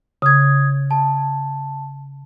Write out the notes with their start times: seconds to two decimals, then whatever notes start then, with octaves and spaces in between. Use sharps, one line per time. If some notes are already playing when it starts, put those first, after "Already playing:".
0.22 C#3 D#6 G#6
0.91 A5